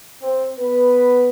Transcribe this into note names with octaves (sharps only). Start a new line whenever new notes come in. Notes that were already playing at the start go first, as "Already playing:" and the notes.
C4 C5
B3 B4